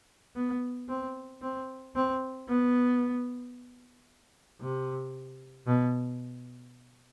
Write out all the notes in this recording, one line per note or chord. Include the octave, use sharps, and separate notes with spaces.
B3
C4
C4
C4
B3
C3
B2